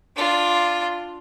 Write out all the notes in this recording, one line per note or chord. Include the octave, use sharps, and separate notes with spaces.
D4 F4